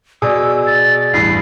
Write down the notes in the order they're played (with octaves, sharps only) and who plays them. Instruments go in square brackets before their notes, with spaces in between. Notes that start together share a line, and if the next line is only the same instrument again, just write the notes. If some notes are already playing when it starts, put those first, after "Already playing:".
[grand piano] B2 [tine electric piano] G#4 D5 [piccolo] E6
[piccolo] A6
[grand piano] A1 E2 G2 [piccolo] C7